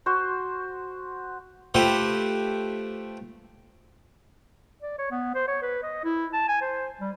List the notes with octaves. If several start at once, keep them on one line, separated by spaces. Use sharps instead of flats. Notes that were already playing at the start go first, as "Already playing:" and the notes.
F#4 C5
A3 F4 G4 B4 C5
D5
C#5
B3
C5
C#5
B4
D#5
E4
A5
G#5
C5
G3